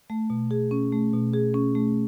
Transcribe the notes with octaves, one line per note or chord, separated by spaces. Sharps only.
A3
B2
G#4
C#4
A3
B2
G#4
C#4
A3